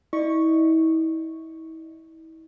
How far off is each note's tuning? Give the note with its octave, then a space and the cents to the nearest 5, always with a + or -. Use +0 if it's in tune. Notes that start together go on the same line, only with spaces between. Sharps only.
E4 -40 D5 +40 C#6 +0